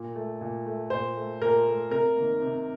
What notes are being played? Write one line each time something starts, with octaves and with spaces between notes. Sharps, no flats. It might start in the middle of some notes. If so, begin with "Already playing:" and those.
Already playing: A#2
A3
A#2
A3
A#2 C5
A3
A#2 A#4
A3
C3 A#4
D#3 A#3
C3